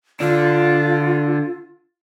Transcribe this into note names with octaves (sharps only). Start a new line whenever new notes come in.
D3 D4 F4